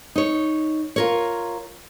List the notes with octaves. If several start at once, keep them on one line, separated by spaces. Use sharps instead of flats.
D#4 C#5
F4 A#4 C#5